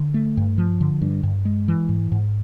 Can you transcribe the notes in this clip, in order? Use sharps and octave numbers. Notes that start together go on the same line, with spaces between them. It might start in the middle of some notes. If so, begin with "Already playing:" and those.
Already playing: D3
A3
G2
F3
D3
G2
G2
G#3
E3
G#2
G#2